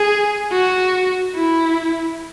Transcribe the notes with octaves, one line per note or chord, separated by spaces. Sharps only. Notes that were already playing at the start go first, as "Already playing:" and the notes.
Already playing: G#4
F#4
E4